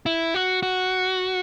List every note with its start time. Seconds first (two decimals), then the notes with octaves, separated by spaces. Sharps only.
0.06 E4
0.34 F#4
0.63 F#4